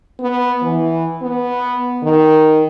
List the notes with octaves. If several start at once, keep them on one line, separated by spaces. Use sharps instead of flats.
B3
E3
B3
D#3